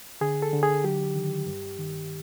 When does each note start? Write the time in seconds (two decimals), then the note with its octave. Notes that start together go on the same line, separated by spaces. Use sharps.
0.21 D3 G#4
0.42 A4
0.53 D3
0.63 G#4
0.84 F#3 G4
1.16 D#3
1.46 G2
1.78 D#3